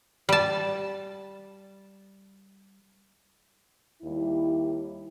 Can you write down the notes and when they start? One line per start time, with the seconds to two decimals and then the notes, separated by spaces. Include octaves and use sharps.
0.29 G3 A5
4.03 D#2 G3 E4